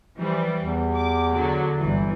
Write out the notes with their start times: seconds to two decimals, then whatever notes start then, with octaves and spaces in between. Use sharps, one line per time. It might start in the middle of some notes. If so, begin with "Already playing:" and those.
0.18 E3 F3 G3
0.60 E2
0.96 D6
1.35 D3 F#3
1.81 G1 E3 G3